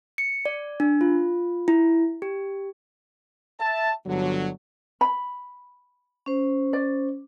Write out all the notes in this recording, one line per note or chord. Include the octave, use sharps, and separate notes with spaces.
C#7
D5
D4
F4
E4
G4
E5 A5
G1 D3 F#3
B5
C#4 C5
D5